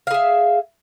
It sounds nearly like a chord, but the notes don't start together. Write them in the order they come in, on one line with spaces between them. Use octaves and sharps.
F5 G#4 E5